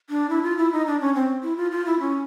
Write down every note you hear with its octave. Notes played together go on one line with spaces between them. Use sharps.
D4
E4
F4
E4
D#4
D4
C#4
C4
E4
F4
F4
E4
C#4